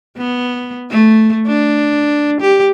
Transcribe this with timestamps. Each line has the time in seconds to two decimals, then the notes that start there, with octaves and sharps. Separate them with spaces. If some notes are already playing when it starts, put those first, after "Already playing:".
0.17 B3
0.90 A3
1.47 D4
2.41 G4